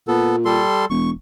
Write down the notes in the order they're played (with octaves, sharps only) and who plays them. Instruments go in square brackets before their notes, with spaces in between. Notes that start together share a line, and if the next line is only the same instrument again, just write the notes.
[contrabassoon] A#2 [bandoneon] B3 A4
[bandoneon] G3 A4 C6
[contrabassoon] E1 [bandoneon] C#6